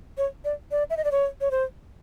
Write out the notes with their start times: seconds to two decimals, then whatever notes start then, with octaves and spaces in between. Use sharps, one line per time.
0.18 C#5
0.45 D5
0.71 D5
0.90 E5
0.97 D#5
1.04 D5
1.12 C#5
1.41 C#5
1.51 C5